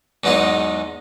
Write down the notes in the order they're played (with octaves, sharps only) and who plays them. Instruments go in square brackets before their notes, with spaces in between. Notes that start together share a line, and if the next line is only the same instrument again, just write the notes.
[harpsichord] E2 G#2 F#3 G#3 B3 D#4